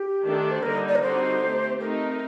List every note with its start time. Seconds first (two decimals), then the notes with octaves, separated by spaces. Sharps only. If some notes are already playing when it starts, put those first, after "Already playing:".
Already playing: G4
0.23 D#3 A3 D4 A4
0.51 C5
0.62 D3 G3 A#3 D#4 A#4
0.88 D5
0.95 A#4
1.02 D3 G3 C4 D#4 F#4 C5
1.41 A3 C4 G4
1.80 A3 C4 D#4 A#4